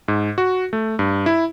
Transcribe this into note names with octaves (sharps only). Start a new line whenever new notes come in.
G#2
F#4
A3
G2
E4